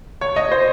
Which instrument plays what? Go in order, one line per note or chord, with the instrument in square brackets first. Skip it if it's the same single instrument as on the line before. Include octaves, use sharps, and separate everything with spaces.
[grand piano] C#5
D#5
C5